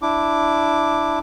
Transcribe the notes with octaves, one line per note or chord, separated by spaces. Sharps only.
D4 E4 D6